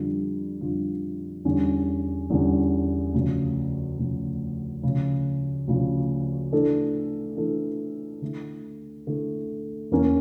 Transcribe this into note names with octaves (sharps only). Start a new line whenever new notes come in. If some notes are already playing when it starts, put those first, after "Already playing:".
Already playing: F2 D3 G3 D4 F4
F2 D3 G3 D4 F4
E2 D3 G3 C#4
E2 D3 G3 C#4
D2 C#3 F3
D2 C#3 F3
D2 C#3 F3
D2 C#3 F3
E3 A3 D4 A4
E3 A3 D4 A4
D3 A3 E4
D3 A3 E4
E2 E3 A#3 C#4